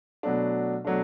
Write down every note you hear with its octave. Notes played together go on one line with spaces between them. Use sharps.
B2 F#3 A3 D4
B2 F#3 A3 D4